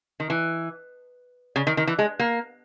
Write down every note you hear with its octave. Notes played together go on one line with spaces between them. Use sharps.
D#3
E3
C#3
D#3
D#3
E3
G#3
A#3